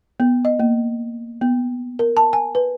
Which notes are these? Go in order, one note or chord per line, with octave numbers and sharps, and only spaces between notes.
B3
D#5
A#3
B3
A#4
A5
G#5
B4